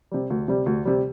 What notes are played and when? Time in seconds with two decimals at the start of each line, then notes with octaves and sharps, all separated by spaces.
0.12 C3 G3
0.30 D2
0.48 C3 G3
0.66 D2
0.86 C3 G3